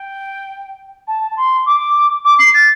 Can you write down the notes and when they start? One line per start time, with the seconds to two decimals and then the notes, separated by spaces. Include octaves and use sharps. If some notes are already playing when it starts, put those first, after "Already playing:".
Already playing: G5
1.07 A5
1.31 A5
1.36 C6
1.66 D6
2.25 D6
2.39 C7
2.54 A6